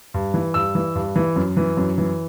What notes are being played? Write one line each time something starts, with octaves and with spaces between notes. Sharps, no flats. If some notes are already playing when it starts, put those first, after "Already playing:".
G2
E3
G2 E6
E3
G2
E3
F#2
E3
F#2
E3